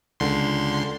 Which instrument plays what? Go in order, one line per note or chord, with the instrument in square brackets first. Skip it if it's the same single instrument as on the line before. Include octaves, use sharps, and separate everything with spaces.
[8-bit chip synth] C#2 D3 C6